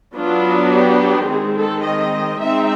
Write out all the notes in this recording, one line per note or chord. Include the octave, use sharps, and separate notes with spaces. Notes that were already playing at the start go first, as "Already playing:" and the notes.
F#3 B3 D4 F4
G4
D#3 G#3 C4 G#4
A4
D#5
G#3 C4 D#4 E5